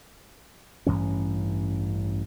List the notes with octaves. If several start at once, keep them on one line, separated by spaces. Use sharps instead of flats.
A1 G2 E3 C#4